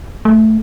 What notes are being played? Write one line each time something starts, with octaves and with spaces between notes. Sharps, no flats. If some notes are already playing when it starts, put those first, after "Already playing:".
A3